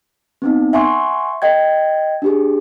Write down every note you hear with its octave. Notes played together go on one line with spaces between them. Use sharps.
B3 C4 D#4
E5 F#5 G#5 C6 C#6
D#5 G5 G#6
D4 G4 G#4